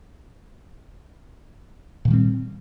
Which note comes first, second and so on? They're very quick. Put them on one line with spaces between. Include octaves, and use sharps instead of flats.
A#2 D#3 G3 C4